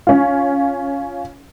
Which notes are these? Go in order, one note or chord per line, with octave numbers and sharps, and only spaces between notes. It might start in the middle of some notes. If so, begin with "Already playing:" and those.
C#4 F4